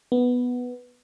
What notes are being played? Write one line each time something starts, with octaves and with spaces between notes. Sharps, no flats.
B3